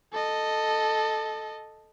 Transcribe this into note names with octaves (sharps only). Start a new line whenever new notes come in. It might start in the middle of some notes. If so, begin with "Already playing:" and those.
A4 D#5